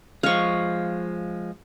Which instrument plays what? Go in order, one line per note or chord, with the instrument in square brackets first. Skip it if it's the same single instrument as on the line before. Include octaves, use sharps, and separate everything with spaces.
[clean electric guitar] F3 G#3 [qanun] F5 C#6